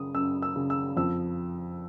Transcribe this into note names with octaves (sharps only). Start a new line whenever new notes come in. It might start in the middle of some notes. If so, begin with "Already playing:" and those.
Already playing: F#2 C#3 D#6
F#2 E6
E6
C#3
E6
F2 E6